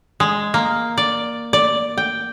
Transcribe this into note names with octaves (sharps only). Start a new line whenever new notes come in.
G#3
A#3
D5
D5
G5